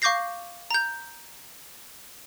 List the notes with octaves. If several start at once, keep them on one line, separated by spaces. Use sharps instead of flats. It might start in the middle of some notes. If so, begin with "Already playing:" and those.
F5 C#6 D6 G6 A#6 C7
A#5 G6